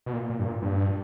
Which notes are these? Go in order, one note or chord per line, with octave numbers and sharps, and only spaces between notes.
B2
A#2
A#2
G2
A#2
G2